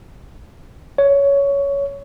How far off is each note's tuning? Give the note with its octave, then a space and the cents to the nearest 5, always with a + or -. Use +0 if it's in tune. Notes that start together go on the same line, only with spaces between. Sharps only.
C#5 +15